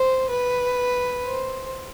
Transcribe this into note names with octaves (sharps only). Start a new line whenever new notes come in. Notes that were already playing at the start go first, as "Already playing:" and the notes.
Already playing: C5
B4
C5